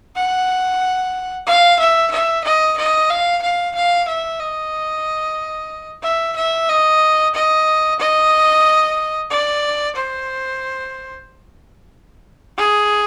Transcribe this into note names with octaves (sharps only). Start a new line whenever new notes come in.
F#5
F5
E5
E5
D#5
D#5
F5
F5
F5
E5
D#5
E5
E5
D#5
D#5
D#5
D5
C5
G#4